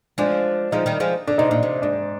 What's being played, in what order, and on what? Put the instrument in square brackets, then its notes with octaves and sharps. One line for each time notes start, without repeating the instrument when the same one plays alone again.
[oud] F3 G#3 [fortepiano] D4
[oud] F3 G#3 [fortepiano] D#4
[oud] D#3 G3
F3 G#3
[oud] D3 [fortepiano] D4
[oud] C3 [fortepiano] D#4
[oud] A#2 [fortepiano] D4
[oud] C3
[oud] G#2 [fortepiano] D4